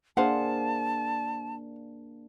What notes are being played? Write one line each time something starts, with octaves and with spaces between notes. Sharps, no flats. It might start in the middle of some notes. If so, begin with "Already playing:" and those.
A#3 D4 G#4 C5 F5 F#5 A5